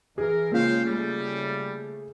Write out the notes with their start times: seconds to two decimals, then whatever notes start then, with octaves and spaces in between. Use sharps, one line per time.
0.18 E3 G#4 A#4
0.52 C#3 G#3 A#3 C#4 F4 C5 F5 G5
0.85 C#3 G3 A3